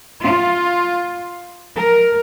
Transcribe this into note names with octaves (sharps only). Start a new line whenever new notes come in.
F4
A#4